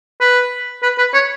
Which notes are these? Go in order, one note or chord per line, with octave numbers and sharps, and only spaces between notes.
B4
B4
B4
C#5